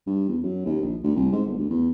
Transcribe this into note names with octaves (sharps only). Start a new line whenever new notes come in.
G2
E2
F#2
D#2
A#1
D2
C2
G#2
G1
D2
E2